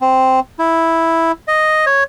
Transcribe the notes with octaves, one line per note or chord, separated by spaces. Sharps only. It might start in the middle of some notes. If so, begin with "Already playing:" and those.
C4
E4
D#5
C#5